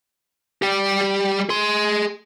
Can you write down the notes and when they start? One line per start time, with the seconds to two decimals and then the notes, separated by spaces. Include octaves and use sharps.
0.62 G3 G4
1.49 G#4 C6